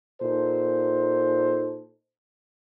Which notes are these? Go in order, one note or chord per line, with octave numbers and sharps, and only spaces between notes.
A#2 D#4 A4 C5